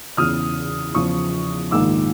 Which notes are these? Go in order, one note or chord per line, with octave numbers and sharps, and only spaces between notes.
E2 C#3 E3 D#6 F6
E2 C#3 F3 C#6 D#6
A#1 G#2 D#3 D6 E6